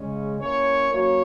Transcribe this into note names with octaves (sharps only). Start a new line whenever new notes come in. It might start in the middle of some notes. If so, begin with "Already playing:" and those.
Already playing: C#3 G#3 C#4
A#3 C#4 E4 A#4 C#5
F#3 A#3 C#4 F#4 C#5